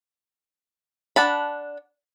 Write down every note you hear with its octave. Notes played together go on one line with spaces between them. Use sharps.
D4 F#5 A5 B5